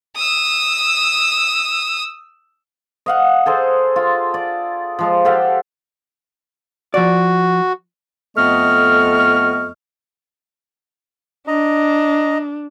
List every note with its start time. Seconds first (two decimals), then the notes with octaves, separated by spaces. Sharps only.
0.16 D#6 E6
3.06 D#5 F5 F#5
3.46 G#4 A4 C5
3.96 F4
4.34 D5
4.99 F3 G#3
5.25 G4 A4 F5 F#5
6.94 F3 F#4 D5
8.37 F2 A3 B3 D#5 C#6 F6
11.48 D4 D#5 A#5